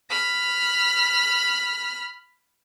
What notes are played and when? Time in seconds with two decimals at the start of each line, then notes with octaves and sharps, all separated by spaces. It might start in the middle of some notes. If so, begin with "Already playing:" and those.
0.10 B5 F6